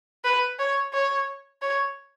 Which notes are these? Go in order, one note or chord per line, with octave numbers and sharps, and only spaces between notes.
B4
C#5
C#5
C#5